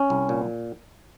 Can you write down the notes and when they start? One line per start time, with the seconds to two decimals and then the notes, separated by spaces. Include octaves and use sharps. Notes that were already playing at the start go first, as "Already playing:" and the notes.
Already playing: C#4
0.10 C2
0.29 A#2